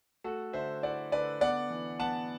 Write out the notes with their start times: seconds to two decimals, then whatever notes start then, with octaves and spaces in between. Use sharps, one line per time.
0.24 A3 F#4 A4
0.53 D3 C5 E5
0.83 E4 D5 F#5
1.12 D3 B4 D5
1.41 B3 D5 F#5
1.70 E3
2.00 B3 F#5 A5